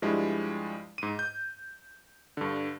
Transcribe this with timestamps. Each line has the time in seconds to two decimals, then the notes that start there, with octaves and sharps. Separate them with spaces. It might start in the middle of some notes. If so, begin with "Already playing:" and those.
0.02 G2 F3 G3 G#3 E4
0.98 G#2 D#7
1.19 G6
2.37 G2 D3